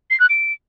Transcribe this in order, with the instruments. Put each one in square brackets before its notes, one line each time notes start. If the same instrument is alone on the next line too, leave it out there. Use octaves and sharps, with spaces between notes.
[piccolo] C7
F#6
D7